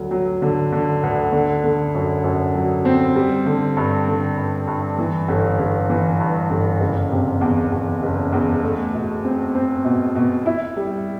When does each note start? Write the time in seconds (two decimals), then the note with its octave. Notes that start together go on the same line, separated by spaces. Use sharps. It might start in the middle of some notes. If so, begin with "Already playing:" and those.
Already playing: D2 F#3
0.11 F#3
0.42 D3
0.72 D3
1.03 D2
1.32 D3
1.64 D3
1.94 F#2
2.24 F#2
2.55 F#3
2.85 C4
3.15 G3
3.46 D3
3.77 G2
4.07 D3
4.37 G2
4.67 G2
4.98 E3
5.28 G1
5.59 G1
5.89 E3
6.20 G2
6.50 G1
6.80 F#1
7.12 C3
7.41 E2
7.72 E2
8.03 F#1
8.32 E2
8.63 A3
8.94 B2
9.24 C4
9.55 C4
9.85 B2
10.15 B2
10.46 E4
10.77 G3